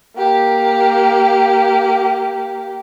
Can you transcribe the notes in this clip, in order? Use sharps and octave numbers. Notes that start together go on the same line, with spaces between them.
A#3 G4